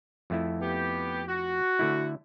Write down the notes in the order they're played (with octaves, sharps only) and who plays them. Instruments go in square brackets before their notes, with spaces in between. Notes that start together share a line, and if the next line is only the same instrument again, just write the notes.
[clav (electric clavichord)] F2 A3 E4
[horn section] B3 G4
F#4
[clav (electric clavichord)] D3 A3 E4